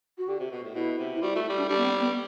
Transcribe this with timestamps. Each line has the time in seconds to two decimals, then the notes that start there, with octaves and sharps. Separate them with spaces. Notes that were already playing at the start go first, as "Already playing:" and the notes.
0.18 F#4
0.28 D3 G4
0.40 C3
0.51 B2 F#4
0.63 A2
0.75 B2 E4
0.98 C3
1.15 E4
1.22 G3 F#4
1.34 A3 F#4
1.45 E4
1.49 G3
1.57 D4
1.68 G3 D4
1.77 B3
1.85 C4
2.00 B3